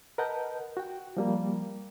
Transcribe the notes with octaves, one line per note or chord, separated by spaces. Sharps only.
A#4 B4 D#5 F#5 A5 G6
F#4 G5
F3 G3 A#3